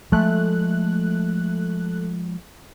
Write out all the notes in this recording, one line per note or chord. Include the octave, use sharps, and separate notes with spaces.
F3 G#3 A3 F#6